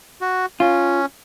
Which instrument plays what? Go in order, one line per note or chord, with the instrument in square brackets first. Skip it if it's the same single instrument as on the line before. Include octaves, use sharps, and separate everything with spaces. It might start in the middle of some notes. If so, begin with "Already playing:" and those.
[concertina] F#4
[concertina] C#4 [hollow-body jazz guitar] F4